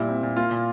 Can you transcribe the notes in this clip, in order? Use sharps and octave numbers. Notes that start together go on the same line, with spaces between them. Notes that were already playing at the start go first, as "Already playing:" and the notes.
Already playing: A#2 G3 E4
C4
A#2
A#3 F4
A#2